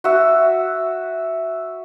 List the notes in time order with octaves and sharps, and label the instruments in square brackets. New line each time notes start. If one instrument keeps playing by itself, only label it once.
[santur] F#4 E5